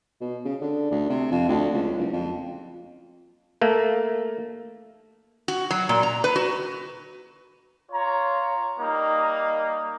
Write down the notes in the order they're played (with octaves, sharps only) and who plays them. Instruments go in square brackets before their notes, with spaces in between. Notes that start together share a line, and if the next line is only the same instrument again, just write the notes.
[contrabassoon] B2
C#3
D3
D2
C3
F2
D2
C#2
F#1
F2
[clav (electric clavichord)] A3 A#3
[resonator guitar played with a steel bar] F#4
F#3
A#2
A#5
B4
F#4
[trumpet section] F4 C#5 A#5
G3 A#3 D#4